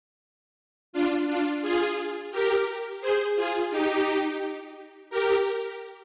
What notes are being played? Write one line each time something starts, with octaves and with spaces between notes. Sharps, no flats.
D4 F4
D4 F4
F4 G#4
G4 A#4
G#4 C5
F4 G#4
D#4 G4
G4 A#4